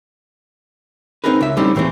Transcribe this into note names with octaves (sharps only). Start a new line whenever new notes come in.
C4 D4 D#4 G#4 A#4 B4
C#2 E5
G3 A3 C4 C#4 D#4 E4
D#2 A2 E3 G#3 C4